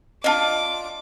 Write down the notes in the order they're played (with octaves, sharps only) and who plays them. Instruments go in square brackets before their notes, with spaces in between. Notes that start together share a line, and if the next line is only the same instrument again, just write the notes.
[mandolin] D4 F4 [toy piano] D#5 A5 [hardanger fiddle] D6